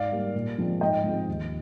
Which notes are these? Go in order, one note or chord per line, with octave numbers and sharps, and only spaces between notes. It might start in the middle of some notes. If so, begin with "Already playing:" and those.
Already playing: G#2 D5 F5
G3 A#3
A#2
F3 G#3 C4
G#2 D#5 G5
F3 G#3 C4
D#2